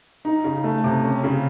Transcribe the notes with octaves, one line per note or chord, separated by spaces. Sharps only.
D#4
C#3
A3
C3
C#4
C#3